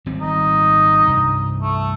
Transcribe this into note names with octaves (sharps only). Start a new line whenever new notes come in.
G#1 G3 C4
D#4
C2 G2 C3
A3